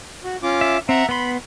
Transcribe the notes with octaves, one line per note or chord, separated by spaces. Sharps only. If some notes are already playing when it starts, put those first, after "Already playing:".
F#4
C#4 F4 D6
E5
C4 E5 F#5 A#5
B3 B5 C6